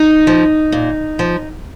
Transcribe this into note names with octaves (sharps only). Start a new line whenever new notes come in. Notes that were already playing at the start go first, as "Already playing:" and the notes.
Already playing: D#4
F3
A#2
F3